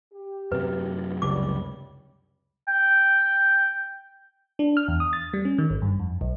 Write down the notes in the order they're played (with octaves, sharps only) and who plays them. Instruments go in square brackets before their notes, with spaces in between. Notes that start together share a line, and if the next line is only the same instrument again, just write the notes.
[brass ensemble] G4
[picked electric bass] F#2 C3 F#3 [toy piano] B4
[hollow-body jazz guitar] C#2 [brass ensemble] G3 [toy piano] D6
[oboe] G5
[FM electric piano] D4
F6
E2
D#6
A6
G3
C#4
D#3
G#1
G2
F2
B1